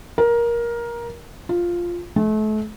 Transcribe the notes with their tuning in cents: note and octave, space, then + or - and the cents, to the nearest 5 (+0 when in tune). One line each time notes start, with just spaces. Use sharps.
A#4 +15
F4 +0
A3 -35